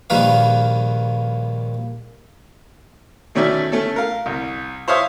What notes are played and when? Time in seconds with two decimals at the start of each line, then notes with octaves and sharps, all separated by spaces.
0.10 A#1 D#3 G3 A#3 B4 F5
3.35 B2 D#3 A3 C#4 D5 E5
3.72 A3 C#4 A4
3.96 A#4 F5
4.26 C2
4.88 C5 C#5 E5 F5 D#6